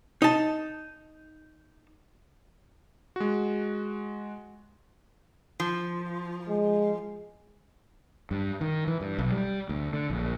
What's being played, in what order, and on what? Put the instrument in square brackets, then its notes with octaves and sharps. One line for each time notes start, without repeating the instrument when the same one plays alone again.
[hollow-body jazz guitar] D#4 A5
[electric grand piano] G#3 F#4
[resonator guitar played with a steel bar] F3
[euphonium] G#3
[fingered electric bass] G2
D#3
E3
G2
B1
G3
D2
D3
A#1